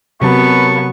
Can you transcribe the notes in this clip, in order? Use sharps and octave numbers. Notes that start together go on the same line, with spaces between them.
F#2 C3 F#3 B3 A5 C#6